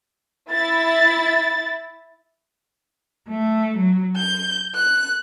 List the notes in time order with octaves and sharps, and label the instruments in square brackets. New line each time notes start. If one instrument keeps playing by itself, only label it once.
[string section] E4 A6
[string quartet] A3
F#3
G6
F#6